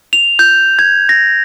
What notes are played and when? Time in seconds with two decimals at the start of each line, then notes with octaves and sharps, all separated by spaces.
0.13 F7
0.39 G6
0.79 G#6
1.09 A#6